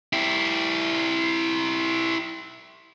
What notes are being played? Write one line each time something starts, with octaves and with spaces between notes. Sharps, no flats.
E4 G4